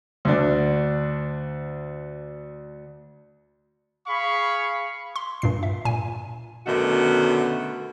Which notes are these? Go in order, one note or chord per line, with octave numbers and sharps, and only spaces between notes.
D2 D4
G#4 F5 B5 C#6
C6
G2 A#2 C7
E5
A#2 G#5
F#2 B2 D3 D#3 A3 F#4